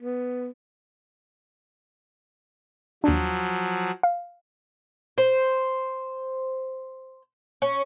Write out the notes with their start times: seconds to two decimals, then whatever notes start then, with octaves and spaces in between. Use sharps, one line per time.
0.02 B3
3.04 D#2 F3 F#3 D4
4.03 F5
5.18 C5
7.62 C#4